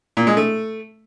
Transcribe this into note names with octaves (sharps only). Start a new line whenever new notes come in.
A#2
G#3
A3